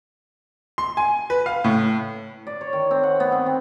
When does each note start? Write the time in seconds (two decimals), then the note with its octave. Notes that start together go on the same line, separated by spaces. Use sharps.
0.78 C6
0.97 G#5
1.30 B4
1.46 F5
1.64 A2
2.47 D5
2.61 C#5
2.73 D#3
2.91 C4
3.03 F#5
3.20 B3
3.32 C4
3.46 C4